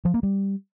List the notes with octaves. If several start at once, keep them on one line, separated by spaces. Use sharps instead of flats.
F3
A#3
G3